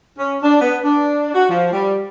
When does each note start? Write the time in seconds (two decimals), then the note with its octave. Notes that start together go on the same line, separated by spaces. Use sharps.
0.18 C#4
0.41 D4
0.61 B3
0.83 D4
1.33 F#4
1.48 F3
1.71 G3